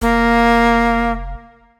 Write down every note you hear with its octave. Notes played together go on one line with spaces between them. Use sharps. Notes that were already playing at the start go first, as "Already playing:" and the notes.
F1 A#3